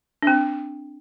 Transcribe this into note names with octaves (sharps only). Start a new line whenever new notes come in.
D4
C4